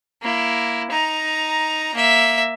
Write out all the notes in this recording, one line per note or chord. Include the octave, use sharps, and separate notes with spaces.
A#3 E4
D#4 A#5
A#3 E5